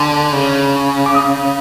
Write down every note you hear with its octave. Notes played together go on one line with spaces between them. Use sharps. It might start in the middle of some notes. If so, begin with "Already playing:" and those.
Already playing: D3 G#5 A5 D6
C#3
D6
D#6